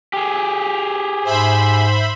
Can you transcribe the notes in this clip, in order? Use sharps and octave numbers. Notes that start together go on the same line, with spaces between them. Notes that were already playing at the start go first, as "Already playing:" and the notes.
G4 G#4
G#2 C5 E5 B5